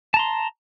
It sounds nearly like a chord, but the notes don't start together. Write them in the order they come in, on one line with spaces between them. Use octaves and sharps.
A5 A#5 C6